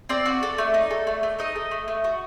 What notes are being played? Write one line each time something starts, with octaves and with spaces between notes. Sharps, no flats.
C4 D5
F#4
A4
A3
D#4
A4
A3
A3
D#4 D#5
A4
A3
A3
F#4